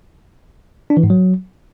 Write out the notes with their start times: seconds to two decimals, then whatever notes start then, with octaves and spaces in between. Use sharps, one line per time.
0.90 D4
0.97 E3
1.03 G#2
1.10 F#3